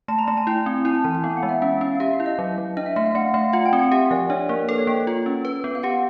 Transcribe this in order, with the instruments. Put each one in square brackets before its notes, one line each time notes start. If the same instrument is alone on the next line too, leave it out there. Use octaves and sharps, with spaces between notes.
[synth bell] A3 [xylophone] A5
[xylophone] A#5
[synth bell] A3 [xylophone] A5
[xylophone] G#5
[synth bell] E4 [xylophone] G5
[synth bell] C4
[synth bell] E4 [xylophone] G#5
[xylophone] A5
[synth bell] E3 [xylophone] G#5
[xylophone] G#5
[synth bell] B3 [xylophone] F5
[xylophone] F#5
[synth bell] G#3
[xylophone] E5
[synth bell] C#4 [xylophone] E5
[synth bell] C#4 [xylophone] F5
[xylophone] F5
[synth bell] G4 [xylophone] E5
[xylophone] F5
[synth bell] E4
[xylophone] D#5
[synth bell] F#3
F#3
[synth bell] D4 [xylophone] D#5
[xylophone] E5
[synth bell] A3 [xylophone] E5
[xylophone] F5
[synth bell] A3 [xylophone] F#5
[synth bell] A3 [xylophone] F5
[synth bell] F4 [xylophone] F#5
[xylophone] G5
[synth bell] C4
[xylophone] F#5
[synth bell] G4 [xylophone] E5
[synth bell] F3 [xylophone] D5
[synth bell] D4 [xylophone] C#5
[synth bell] A#3 [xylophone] A#4
[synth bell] A4 [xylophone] B4
[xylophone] C#5
[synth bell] A#3 [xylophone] G5
[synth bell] F4
C#4
B4
B3
[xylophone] F5
[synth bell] G4 [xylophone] F#5